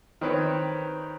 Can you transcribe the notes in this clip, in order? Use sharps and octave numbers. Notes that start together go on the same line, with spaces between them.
D#3 C4 B4 C#5